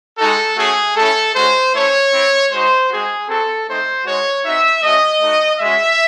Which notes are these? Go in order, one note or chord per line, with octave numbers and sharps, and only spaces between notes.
G#3 D#4 F#4 A4
A3 C#4 F#4 G#4
A3 C#4 E4 A4
G#3 C#4 F#4 C5
A3 C#4 E4 C#5
C4 E4
G#3 D#4 F#4 C5
G#3 C4 F#4 G#4
C4 F#4 A4
A3 C4 D#4 C5
G#3 D#4 F#4 C#5
C4 D#4 F#4 E5
A3 C#4 F#4 D#5
A3 D#4 F#4
G#3 C#4 F#4 E5